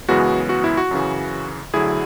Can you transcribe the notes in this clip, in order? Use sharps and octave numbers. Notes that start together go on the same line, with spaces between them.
F#2 C#3 E3 G#3 B3 F#4
F#4
E4
F#4
F#2 C#3 E3
D2 D3 F#3 E4 G#4